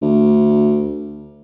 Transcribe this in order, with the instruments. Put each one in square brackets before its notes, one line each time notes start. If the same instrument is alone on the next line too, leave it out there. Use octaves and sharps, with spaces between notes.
[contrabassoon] D2